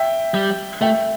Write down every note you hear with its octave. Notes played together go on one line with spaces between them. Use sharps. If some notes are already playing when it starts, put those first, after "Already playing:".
Already playing: E5 G5
G3
A3 E5 G5